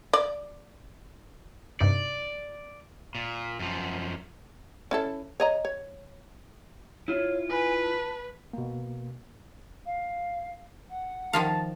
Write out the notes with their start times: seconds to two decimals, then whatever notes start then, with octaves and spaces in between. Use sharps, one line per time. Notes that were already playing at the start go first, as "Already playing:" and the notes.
0.13 D5
1.80 G2 C3 D#4 D5
3.15 A#2
3.59 F#2 F3
4.91 C#4 E4 A4
5.40 C#5 D#5 A#5
5.65 C#5
7.08 E4 F4 C#5
7.50 B4 G#5
7.82 A5
8.53 B2 A#3
9.85 F5
10.89 F#5
11.33 D#3 F3 F5 A5